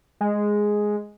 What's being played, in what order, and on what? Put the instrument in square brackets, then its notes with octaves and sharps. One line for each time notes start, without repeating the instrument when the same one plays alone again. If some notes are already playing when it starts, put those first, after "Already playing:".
[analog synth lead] G#3